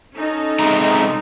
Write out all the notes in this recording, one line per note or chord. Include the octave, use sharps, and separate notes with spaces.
C#4 D#4 A4
C3 G#3 A#5